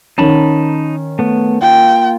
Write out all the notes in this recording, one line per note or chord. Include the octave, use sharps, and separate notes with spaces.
D#3 C#4 D#4 A5 B5
A3 B3
A#3 F4 G5